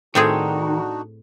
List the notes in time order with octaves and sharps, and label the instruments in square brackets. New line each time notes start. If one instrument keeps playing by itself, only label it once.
[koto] A2 C4 G#4 [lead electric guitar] D#3 [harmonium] D4 D#4 F#4